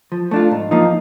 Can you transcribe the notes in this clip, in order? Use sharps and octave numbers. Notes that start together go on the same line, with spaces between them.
F3
A3 D4 F4
G#2
F3 A#3 D#4